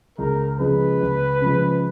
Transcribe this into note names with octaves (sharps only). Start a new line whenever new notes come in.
C#2 A#4
C#3 F3 G#3 B4
C#2
C#3 F3 G#3